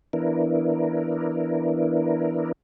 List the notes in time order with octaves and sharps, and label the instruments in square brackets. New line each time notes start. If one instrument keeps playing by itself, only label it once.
[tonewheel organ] E3 B3 D4 E4 A#4